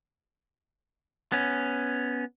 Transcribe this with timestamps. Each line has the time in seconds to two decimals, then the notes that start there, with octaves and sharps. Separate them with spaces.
1.32 B3 C#4